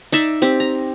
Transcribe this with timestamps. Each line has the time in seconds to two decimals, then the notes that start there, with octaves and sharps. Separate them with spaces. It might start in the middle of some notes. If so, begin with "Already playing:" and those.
0.12 D#4 D5 E5
0.42 C4 G4
0.60 A#5